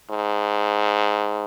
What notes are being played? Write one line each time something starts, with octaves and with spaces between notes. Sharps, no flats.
G#2